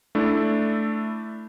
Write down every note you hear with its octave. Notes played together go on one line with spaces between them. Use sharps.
A3 D4 E4